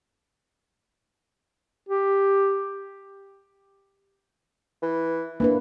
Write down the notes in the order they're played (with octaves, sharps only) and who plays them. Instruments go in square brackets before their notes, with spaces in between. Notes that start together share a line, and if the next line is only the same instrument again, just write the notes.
[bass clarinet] G4
[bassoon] E3
[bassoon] E3 [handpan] A#3 D4 B4